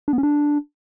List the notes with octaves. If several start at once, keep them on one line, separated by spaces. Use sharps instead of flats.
D4
B3
C#4
D4